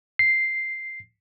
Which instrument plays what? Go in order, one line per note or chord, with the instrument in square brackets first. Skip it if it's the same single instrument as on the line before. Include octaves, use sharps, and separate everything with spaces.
[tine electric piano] C7